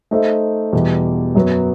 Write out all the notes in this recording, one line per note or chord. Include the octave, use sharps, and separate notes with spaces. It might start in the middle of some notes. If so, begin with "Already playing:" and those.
A3 D#4 A4 C5 E5
E2 B2 G3
F#2 F#3 B3